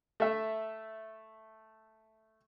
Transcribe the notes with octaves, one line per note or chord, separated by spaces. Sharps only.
A3 E5